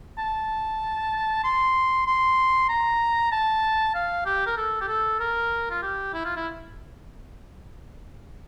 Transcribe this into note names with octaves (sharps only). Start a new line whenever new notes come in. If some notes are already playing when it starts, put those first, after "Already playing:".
A5
C6
C6
A#5
A5
F5
G4
A#4
A4
G4
A4
A#4
F4
G4
E4
F4
E4